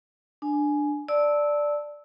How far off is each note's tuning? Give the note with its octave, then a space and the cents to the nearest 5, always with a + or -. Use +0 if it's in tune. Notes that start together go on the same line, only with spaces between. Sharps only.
D4 +10 G#5 +10
D5 +0 A5 +0 E6 -15